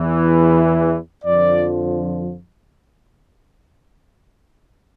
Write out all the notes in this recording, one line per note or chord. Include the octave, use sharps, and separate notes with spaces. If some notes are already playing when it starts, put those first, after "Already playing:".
Already playing: E2 E3
F2 D3 F3 D5